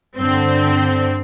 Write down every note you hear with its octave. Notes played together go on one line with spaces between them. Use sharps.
G2 D3 C4